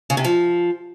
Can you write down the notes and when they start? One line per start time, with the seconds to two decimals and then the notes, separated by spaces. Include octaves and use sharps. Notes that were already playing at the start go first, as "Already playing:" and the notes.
0.10 C#3
0.17 C3
0.24 F3